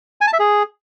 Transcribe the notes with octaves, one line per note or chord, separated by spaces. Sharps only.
G#5
A5
E5
G#4